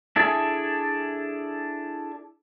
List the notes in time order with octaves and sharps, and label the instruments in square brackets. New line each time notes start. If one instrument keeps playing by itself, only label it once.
[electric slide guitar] D4 E4 G#4 A4